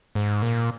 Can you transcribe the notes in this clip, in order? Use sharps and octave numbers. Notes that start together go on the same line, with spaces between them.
G#2
A#2